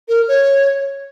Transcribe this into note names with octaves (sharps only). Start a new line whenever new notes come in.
A#4
C#5